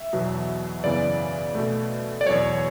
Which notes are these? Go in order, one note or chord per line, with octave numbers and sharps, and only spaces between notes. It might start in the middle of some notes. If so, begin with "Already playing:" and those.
Already playing: E5
E2 B2 F#3 B3
F#2 C#3 E3 B3 D5
B2 A3
D5
E2 B2 F#3 C#5